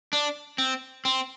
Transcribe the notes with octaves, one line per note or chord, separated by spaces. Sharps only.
D4
C4
C4